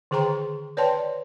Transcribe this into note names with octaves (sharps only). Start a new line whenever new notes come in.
D3 D#3 G#4 G5 A#5 C6
B4 C#5 D5 G5 A5 C6